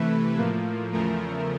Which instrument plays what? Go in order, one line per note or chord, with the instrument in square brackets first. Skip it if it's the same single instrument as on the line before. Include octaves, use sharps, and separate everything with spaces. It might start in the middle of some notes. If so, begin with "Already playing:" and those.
Already playing: [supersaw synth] C3 E3 A3 B4
A2 F3 A#3
E2 C#3 F3 A3 A#4